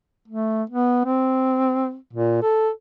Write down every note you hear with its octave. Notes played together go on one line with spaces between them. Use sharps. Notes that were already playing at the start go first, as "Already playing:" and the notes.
A3
B3
C4
A#2
A4